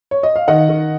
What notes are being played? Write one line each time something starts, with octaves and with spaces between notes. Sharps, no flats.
C#5
D#5
F5
D#3 D#5 F#5
D#3